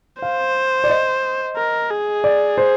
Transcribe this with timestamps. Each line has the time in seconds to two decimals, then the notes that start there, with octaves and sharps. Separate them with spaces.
0.22 C5 F5
0.84 D5
0.90 D#5
1.57 A#4
1.90 G#4
2.24 D5
2.58 C5